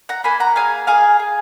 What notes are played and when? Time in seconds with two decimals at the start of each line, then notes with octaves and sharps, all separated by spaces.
0.09 F#5 A#5
0.24 A#3 G#5 B5
0.40 F#5 A#5
0.56 G#4 F5 G#5
0.87 G#4 F5 G#5
1.19 G#4